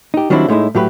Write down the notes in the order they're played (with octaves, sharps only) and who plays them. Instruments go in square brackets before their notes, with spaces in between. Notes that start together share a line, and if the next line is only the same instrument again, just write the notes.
[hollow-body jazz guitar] D#4 G4
D#3 F#3 G3 C4 D4 E4
A2 G#3 D#4 E4
A2 F#3 G4 B4